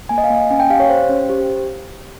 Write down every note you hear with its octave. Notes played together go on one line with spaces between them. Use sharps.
A#3 G#5
D#5
F5
A#3
C#4 G#5
G5
G4 F5
C#5
G4 C5
C#4
G4